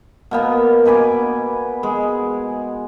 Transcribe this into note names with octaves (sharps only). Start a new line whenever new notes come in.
B2 A#3 B3
B2 B4 G#5 D6
G#3 G#4